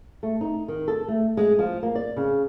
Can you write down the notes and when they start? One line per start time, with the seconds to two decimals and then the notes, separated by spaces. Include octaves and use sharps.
0.23 A3
0.41 D#4
0.68 D#3
0.88 A4
1.08 A3
1.37 G#3
1.59 F3
1.83 A#3
1.95 D5
2.16 C#3